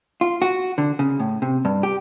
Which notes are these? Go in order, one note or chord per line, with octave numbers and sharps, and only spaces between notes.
F4
F#4
D3
C#3
A2
C3
G2
G4